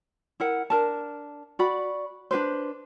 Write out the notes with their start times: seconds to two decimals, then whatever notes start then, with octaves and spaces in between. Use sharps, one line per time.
0.40 E4 A#4 F#5
0.70 D4 A#4 A5
1.59 F#4 D5 B5
2.31 D4 G4 B4 C5